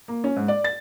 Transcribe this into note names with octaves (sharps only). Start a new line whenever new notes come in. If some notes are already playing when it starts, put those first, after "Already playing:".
A#3
C#4
G#2
D5
A6